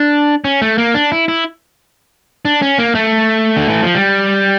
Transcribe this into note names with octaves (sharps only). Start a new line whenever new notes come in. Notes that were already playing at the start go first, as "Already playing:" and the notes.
Already playing: D4
C#4
A3
A#3
D4
E4
E4
D4
C#4
A#3
A3
D3
E3
F3
G3